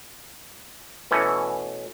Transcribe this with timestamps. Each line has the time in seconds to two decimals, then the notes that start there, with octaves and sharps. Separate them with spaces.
1.11 B2 E3 A3 C#4